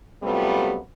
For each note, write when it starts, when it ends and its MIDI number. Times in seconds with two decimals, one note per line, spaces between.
0.23 0.77 42
0.23 0.77 48
0.23 0.77 55
0.23 0.77 57
0.23 0.77 59
0.23 0.77 65